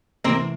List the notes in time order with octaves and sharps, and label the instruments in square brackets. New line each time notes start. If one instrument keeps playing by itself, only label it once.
[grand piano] C3 E3 A3 [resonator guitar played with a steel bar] A#3 C4